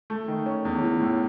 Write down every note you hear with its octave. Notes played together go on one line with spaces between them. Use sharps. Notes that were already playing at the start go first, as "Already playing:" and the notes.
A3
D#3
C#4
E2
E3
A2